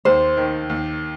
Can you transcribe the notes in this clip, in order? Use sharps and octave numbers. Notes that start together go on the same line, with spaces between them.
D#2 C5
D#3
D#2